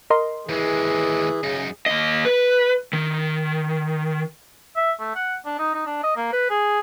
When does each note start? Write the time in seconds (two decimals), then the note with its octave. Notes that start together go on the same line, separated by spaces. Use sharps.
0.10 A#4 D#5 C6
0.49 D#2 E3 G#3 G#4
1.43 F#2 C#3 D#4
1.86 D#2 D#5
2.25 B4
2.93 D#3
4.76 E5
5.00 A3
5.15 F#5
5.46 D4
5.59 D#4
5.75 D#4
5.86 D4
6.03 D#5
6.17 A#3
6.33 B4
6.50 G#4